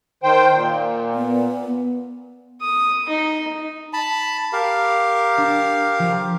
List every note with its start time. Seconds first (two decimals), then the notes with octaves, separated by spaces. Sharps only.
0.23 D#3 C5 G5
0.53 A#2
1.15 B3
2.61 D#6
3.09 D#4
3.93 A5 B5
4.53 G4 A#4 F5
5.38 D4
5.99 F3